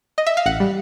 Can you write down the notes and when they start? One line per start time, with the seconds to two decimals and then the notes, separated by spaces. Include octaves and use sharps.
0.18 D#5
0.26 E5
0.37 F5
0.46 A1 F#5
0.60 G3